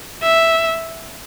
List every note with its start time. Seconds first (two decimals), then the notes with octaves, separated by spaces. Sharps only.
0.23 E5